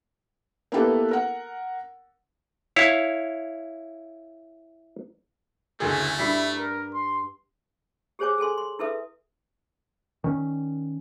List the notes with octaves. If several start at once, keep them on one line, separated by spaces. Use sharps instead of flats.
A#3 B3 E4 G4 A4 B4
A#4 F#5
E4 C#5 F5
F#1 D2 A3 G#4
G2 G3 E4 B6
A#4
C6
G4 G#4 C5 C#5 G#5 D6
G#4 A4 G#5 C6
C6
E4 A4 B4 E5 D#6
D#3 C#4